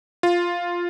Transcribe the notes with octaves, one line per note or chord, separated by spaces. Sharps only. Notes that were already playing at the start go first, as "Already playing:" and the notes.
F4